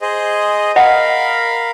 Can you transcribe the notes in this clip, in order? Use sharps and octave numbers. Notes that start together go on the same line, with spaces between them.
G#4 C5 D#5
A#4 D#5 F5 F#5 B5